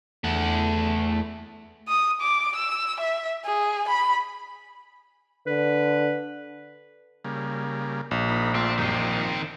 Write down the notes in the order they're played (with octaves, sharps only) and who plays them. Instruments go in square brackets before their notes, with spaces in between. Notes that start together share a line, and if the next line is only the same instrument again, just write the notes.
[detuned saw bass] E2 [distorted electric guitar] A3 F#5
[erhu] D#6
D6
E6
E5
G#4
B5
[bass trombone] D3 [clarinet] B4
[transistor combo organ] C#3 G3 A#3
[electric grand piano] A#1
[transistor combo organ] D#4 A#4 B5
[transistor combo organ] A3 D4 F4 [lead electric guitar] C4
[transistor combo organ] F#2 G3 G5 [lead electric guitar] D#3 C4
[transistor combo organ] F3